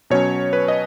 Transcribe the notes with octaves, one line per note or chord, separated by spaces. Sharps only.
B2 F#3 C#4 C#5
B4
D#5